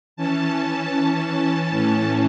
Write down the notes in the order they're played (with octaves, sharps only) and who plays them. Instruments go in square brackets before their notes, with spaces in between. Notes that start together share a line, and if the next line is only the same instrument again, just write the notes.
[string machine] E3 C#4 A5
A2 E3 C#4 A5